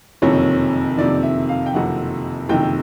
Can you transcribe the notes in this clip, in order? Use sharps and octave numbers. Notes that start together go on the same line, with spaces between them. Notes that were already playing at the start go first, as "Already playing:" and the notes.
F#1 F2 C3 D#3 C#5
F#1 F2 C3 D#3 D5
E5
F5
G5
F#1 F2 C3 D#3 F#5
F#1 F2 C3 D#3 G5